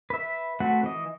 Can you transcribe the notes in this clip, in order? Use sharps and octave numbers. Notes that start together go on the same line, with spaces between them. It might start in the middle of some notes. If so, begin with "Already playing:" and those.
B4 E5
A3 C4 F#4 B4 F#5
E3 D#5